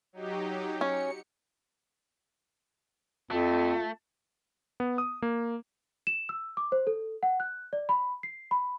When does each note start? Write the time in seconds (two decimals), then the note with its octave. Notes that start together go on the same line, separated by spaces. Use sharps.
0.13 F#3 D#4 G4
0.81 C#4 C#7
3.31 F2 A3 F4
4.80 B3
4.98 D#6
5.22 A#3
6.07 E7
6.29 E6
6.57 D6
6.72 C5
6.87 A4
7.23 F#5
7.40 F#6
7.73 D5
7.89 B5
8.23 C7
8.51 B5